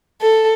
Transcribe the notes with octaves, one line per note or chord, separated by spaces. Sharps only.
A4